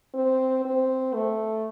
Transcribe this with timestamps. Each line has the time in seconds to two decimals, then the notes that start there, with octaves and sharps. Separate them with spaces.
0.14 C4
0.65 C4
1.14 A3